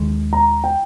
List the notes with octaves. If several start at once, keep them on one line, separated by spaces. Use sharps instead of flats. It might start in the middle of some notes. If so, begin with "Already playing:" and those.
Already playing: D#2 D#3 G#3
A#5
G5